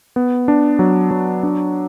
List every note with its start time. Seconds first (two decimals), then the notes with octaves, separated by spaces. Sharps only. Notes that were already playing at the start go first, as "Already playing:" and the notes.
0.16 B3
0.48 D4
0.79 F#3
1.11 F#3
1.43 D4